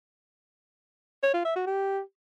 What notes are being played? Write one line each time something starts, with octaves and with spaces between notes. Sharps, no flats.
C#5
F4
E5
F#4
G4